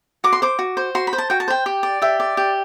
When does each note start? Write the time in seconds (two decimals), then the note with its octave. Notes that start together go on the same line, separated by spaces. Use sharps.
0.24 F#4 D6
0.33 C6
0.42 C5 D6
0.59 F#4
0.77 C5
0.95 F#4 C6
1.07 B5
1.13 C5
1.18 A5
1.30 F#4 G5
1.40 A5
1.48 C5 G5
1.66 G4
1.83 D5
2.02 G4 E5
2.20 D5
2.37 G4